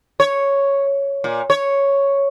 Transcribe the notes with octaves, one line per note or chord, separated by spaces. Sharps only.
C#5
A#2
C#5